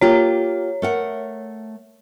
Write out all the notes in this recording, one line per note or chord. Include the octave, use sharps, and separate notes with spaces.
A#3 F4 G4 C#5
A3 A#4 F#5